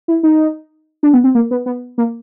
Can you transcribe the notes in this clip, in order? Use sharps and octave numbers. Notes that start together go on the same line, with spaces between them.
E4
D#4
D4
B3
C4
A#3
B3
B3
A#3